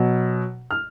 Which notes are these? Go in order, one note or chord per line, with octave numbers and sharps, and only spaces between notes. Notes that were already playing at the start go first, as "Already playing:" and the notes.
Already playing: B2 F#3
F6